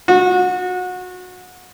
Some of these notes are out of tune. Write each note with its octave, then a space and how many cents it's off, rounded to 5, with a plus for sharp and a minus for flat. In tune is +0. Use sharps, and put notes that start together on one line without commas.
F#4 -25